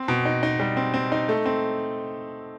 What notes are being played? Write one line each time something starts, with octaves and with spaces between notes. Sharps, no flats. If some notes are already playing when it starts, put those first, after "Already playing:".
Already playing: C4
B2
D#4
D#4
G3
C4
C4
D#4
A3
C4